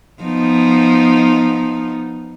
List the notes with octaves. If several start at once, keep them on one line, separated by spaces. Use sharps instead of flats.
F3 B3 D#4